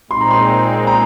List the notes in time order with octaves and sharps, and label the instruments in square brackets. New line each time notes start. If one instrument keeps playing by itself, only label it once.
[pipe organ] A#2 G#3 C4 D#4 [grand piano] C6
[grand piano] A#5
C6
A#5